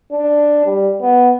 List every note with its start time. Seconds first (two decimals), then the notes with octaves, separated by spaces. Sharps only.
0.12 D4
0.66 G3
1.01 B3